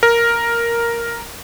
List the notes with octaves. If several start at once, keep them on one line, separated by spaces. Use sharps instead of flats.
A#4